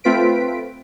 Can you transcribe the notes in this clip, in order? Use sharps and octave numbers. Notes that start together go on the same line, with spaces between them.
A3 C4 F4 B4 B6 D7